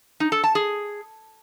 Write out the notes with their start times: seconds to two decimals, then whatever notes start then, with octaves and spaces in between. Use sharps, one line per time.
0.20 D#4
0.32 A4
0.44 A5
0.55 G#4